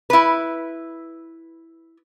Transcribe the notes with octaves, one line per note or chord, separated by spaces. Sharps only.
E4 B4